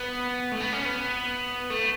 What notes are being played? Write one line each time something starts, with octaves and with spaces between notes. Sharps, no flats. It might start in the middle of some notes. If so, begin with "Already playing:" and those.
Already playing: B3
A3
B3
C#4
B3
A3